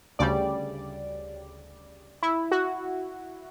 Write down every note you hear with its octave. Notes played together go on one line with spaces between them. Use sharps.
D2 C#3 G3 D5
E4
F#4